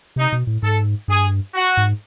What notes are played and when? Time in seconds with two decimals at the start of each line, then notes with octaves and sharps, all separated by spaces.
0.16 C3 D#4
0.32 B2
0.47 A2
0.62 G#2 A4
1.08 G2 G#4
1.54 F#4
1.77 G#2